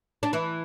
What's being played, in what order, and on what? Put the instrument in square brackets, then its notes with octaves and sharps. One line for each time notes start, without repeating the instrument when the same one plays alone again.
[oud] D4
E3 E4